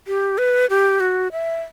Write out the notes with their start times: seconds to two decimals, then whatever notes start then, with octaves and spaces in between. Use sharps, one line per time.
0.07 G4
0.38 B4
0.70 G4
1.00 F#4
1.32 E5